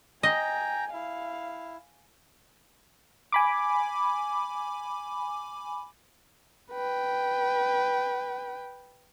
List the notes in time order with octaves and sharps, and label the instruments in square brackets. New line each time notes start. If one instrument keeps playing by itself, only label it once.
[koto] D#5 [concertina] G5 A#5 [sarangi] G#5
[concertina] E4 [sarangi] F5
[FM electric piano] G#5 B5 D6
[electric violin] B4 G5